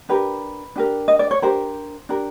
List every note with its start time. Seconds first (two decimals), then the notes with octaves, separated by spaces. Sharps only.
0.09 D4 G4 A#4 B4
0.76 D4 G4 A#4
1.08 D#5
1.19 D5
1.31 C#5
1.42 D4 G4 A#4 C5
2.09 D4 G4 A#4